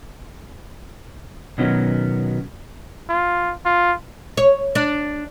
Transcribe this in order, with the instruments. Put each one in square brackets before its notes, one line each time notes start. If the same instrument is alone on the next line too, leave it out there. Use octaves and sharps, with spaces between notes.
[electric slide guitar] B2 D#3 F#3 B3 C#4
[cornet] F4
F4
[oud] C#5
D4